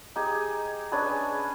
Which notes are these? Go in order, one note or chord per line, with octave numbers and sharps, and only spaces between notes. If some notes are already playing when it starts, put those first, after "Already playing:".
D#4 G4 G#4
C#4 D4 G#4 B4